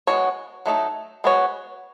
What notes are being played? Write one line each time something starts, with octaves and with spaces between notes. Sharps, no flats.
G#3 B3 F#4 C#5
F#3 A3 D#4 A4
G#3 B3 F#4 C#5